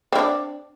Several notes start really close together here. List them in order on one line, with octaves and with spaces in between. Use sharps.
C4 E4 D4